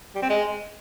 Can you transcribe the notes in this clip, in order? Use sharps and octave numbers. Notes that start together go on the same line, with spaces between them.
G3
C4
G#3